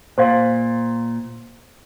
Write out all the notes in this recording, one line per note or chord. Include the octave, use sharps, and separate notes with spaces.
A#2 C5 F5 C6